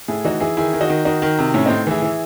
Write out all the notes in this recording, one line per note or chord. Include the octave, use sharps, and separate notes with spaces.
A2 E4 G#4
E3 D#4 F#4
E3 E4 G#4
D#3 E4 G#4
D#3
D#4 F#4
D#3
D#3 D#4 F#4
D#3
C3
A2 C#4 E4
A2 C4 D#4
E3 E4 G#4
E3